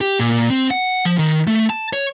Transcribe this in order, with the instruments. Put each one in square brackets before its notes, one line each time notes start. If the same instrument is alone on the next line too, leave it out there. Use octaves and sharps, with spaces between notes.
[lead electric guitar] G4
A#2
C4
F#5
F3
D#3
A3
A5
C#5